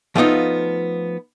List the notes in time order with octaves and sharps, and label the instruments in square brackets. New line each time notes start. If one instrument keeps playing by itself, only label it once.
[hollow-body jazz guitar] F3 A3 B3 D4 D#4 F4